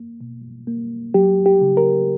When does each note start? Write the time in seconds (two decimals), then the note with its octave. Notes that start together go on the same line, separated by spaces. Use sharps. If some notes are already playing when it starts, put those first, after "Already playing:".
Already playing: A#3
0.21 B2
0.67 A#3
1.14 F#3 G4
1.46 G4
1.61 C#3
1.77 A#4